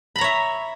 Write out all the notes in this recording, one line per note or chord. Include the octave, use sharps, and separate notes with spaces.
C#5 E5 A#5 B5